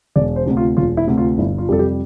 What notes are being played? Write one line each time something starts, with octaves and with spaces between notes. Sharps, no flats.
E1 D5
C5
D2 C3
F4
E1 F4
E4
D2 C3
F4
G1 E4
F4
F2 C3 G3 A4
G4